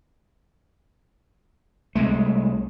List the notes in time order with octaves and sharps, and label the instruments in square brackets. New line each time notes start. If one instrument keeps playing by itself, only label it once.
[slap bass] C2 G#3 A3